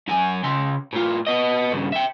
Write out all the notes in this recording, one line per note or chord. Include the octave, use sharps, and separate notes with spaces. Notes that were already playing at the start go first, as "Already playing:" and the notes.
F#2 G#5
C#3 C6
A2 F4
B3 D#5
G2 C#3
E5 G5